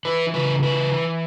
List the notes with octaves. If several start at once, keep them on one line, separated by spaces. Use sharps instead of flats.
E3 B4
C#3 B4
E3 B4
E3